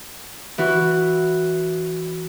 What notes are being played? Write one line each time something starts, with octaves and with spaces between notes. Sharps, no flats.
E3 F#4